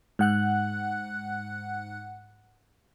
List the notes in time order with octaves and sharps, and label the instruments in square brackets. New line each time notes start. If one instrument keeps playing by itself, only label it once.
[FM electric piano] G#2 F#5 F#6